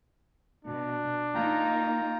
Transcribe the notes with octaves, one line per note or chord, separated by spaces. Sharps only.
B2 D4
A#3 D#4 F4 G5 A#5